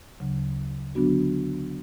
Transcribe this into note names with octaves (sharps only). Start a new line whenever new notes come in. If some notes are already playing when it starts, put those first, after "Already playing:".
D2 C#3 F#3
D3 F#3 B3 D4 F#4